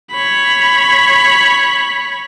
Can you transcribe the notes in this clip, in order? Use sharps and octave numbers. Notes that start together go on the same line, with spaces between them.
C#5 B5